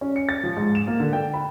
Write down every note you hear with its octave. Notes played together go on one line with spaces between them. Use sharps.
C#4
C#7
A6
F3
G#2
E7
A#3
D3
G5
B5